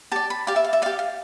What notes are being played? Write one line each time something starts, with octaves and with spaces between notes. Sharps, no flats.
G4 D5 A5
B5
G4 D5 F5
E5
F5
E5
G4 D5 F5
F5